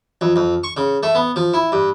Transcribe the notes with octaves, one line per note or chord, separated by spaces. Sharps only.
F2
F2
C#6
C#3
A3
B3
F3
E4
G2